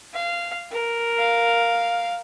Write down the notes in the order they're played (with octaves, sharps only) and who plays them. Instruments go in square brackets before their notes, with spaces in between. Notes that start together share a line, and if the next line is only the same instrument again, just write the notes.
[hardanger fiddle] F5
A#4
[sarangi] F5